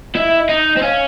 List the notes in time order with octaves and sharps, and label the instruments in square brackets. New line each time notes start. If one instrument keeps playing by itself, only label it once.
[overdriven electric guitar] E4 [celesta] D#5
[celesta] E5
D#5
[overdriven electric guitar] D#4
C4
[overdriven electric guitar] C#4 [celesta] F5